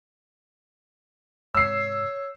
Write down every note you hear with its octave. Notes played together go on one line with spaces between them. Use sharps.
G#2 C3 C#5 E6 C7